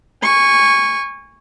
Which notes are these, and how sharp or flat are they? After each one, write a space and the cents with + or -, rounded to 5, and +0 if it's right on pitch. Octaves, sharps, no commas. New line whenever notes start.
G#5 -20 C#6 +0